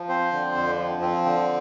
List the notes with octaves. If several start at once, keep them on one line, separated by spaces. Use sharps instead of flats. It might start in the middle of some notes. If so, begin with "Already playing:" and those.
Already playing: F3
C4 C5
D3
F2
F3
C4
D3